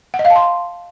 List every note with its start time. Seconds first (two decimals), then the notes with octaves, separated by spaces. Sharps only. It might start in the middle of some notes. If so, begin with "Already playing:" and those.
0.14 F#5
0.19 D#5
0.25 F5
0.30 A5
0.36 C6